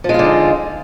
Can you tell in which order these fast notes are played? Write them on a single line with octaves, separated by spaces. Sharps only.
F3 G#3 F4 D3 D#4